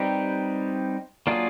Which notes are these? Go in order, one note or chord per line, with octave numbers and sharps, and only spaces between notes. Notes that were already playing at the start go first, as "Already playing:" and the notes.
Already playing: G3 C4 D#4 G4 B4
F#3 A#3 D4 F4 G#4